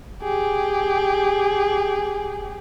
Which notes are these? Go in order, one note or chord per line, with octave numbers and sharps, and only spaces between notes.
G4 G#4